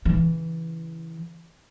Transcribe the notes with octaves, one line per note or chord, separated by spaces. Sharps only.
C#3 E3